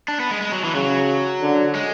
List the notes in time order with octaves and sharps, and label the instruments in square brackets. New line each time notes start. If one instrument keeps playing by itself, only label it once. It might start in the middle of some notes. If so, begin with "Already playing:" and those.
[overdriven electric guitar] D4
B3
G#3
G#3
F#3
E3
[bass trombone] C#3 [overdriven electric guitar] F#3
[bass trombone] D3
[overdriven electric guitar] G#3